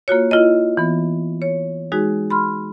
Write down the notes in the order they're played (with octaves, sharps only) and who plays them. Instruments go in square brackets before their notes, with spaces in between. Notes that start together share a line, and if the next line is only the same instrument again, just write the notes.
[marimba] A#3 F4 F#4 C#5
E4 F4 D#5
E3 B3
C#5
G#3 D#4 F#4 G#4
B5 C6 F6